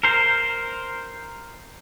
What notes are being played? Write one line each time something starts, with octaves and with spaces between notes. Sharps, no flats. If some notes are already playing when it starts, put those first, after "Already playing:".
A#4 C5